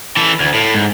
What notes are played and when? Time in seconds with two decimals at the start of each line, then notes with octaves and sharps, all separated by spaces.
0.17 E3 A4
0.40 D2
0.54 A2
0.74 G#2